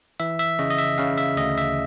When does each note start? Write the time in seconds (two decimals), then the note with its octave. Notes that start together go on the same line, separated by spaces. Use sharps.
0.20 E3 E5
0.39 E5
0.59 C#3 D#5
0.70 D#5
0.79 E5
0.98 C#3 F5
1.18 E5
1.37 D2 D#5
1.58 E5